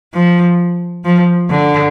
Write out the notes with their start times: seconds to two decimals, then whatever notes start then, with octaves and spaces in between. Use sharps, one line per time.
0.14 F3
1.05 F3
1.50 D3